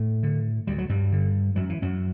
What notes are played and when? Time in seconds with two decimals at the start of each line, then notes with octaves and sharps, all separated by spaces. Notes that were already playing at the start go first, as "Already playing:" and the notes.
Already playing: A2 A3
0.23 D3
0.67 D2 G3
0.78 F#3
0.89 G2 G3
1.12 D3
1.56 F#2 F#3
1.70 E3
1.82 F#2 F#3